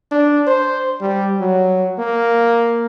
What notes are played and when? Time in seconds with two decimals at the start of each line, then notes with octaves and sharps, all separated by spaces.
0.11 D4
0.47 C5
1.01 G3
1.40 F#3
1.99 A#3